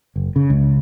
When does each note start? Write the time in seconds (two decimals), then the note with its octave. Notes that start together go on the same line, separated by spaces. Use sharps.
0.16 F#1
0.36 C#3
0.50 C#2